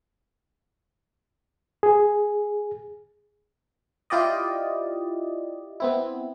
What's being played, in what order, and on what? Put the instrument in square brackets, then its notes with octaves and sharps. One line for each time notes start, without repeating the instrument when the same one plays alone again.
[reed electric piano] G#4
[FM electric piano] E4 F4 G4 D5 D#5
B3 C4 E4